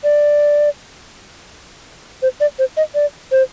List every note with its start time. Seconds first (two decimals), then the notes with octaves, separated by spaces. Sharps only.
0.04 D5
2.22 C5
2.40 D5
2.59 C5
2.77 D#5
2.95 D5
3.32 C5